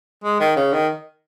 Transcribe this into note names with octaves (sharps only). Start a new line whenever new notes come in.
G#3
D#3
C#3
D#3